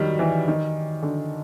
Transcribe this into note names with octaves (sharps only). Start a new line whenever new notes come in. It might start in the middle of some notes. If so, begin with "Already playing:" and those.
Already playing: D#3 F#3 G3
E3
D#3
D3